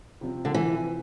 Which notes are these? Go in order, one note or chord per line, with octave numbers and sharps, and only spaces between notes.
C3 F3 C4
D3
E3